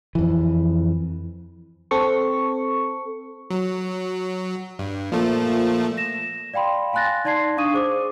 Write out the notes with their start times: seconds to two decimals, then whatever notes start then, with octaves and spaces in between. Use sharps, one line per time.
0.15 F2 E3
1.91 C4 A4 C#6
3.50 F#3
4.79 G2
5.12 A#2 F3 A3
5.97 A#6 E7
6.54 D5 F5 G5 B5 C6
6.93 F5 G#5 C6 F#6 A6 A#6
7.25 D#4 D5 A5 C6 G#6 C7
7.57 D4 F5 C#6 D#6 D#7
7.74 G#4 C5 D6